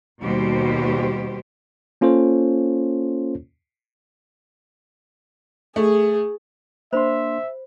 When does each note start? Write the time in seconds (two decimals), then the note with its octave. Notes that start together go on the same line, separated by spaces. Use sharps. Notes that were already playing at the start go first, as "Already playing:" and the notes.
0.21 D#2 B2 G3 F#4 G4 C5
2.01 A#3 C#4 F4 A4 C5 C#5
5.76 A3 G#4
6.93 A#3 D4 C5 E5 B5 C6